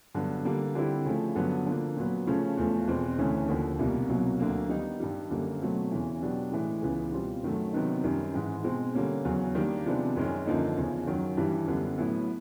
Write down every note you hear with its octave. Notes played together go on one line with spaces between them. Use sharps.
G2 D3 F#3 B3
D3 G3 A#3
D3 G3 C4 E4 G4
C#3 F3 A3
G2 D3 F#3 B3
D3 F3 A#3
A#2 F#3 B3
C#3 F3 A3 C#4
E2 C#3 F3 A3
E2 B2 G#3 C4
D2 C#3 E3 A3 C#4
D#2 D3 F3
C2 B2 G3 A#3
C2 B2 F#3 A#3
D2 D3 F#3 A#3
D#3 G3 B3 D#4
G2 D#3 G3
F#2 D3 G3 A#3
B2 F#3 A3 C4
E2 C#3 E3
B2 F#3 B3 D4 G4
A2 E3 G#3
C#2 C#3 E3 G#3 B3
B2 G3 C4 F4
F#2 D#3 F#3 A3
C3 D#3 F#3 B3 D#4
F#2 D#3 G3
G#2 E3 G#3
B2 G#3 C4
D3 G3 A#3 C#4
E2 C#3 F#3
D#3 G3 A#3 D4
C3 F3 G#3 B3 D4
F#2 D#3 G#3 C#4
F#2 D3 F3 A#3 D#4
E2 C#3 F3
F#2 D#3 F#3
G2 E3 G3
F#2 D3 G3 B3
A2 F#3 B3 E4